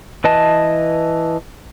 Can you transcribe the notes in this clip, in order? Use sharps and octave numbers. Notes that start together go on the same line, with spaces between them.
E3 B4 D#5 A5